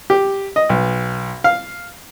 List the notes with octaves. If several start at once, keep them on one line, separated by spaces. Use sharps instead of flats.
G4
D#5
B1
F5